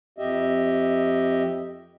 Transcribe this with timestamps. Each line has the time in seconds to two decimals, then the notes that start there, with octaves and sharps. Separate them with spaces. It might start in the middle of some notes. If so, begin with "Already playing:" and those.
0.18 F2 G4 D#5 E5